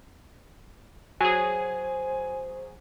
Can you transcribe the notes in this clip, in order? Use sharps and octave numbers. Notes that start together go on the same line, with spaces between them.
F#3 G#4 C5 G#5